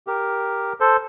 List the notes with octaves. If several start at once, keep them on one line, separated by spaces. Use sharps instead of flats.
G4 A#4
A4 C5